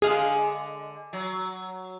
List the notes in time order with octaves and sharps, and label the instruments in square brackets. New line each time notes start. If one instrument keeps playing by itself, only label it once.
[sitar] D3 G#3 [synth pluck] G#4 F5
[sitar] F#3